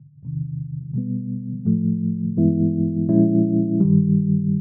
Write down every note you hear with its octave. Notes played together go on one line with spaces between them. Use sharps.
E2 C3 D#3
B2 G3 B3
A2 F3 A3
G2 E3 G#3 B3 E4
A#2 F3 G#3 C#4 E4
G2 D#3 G3